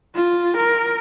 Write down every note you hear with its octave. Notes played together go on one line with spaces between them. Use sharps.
F4
A#4